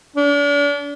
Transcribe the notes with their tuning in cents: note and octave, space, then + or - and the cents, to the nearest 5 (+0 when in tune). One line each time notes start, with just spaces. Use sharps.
D4 -40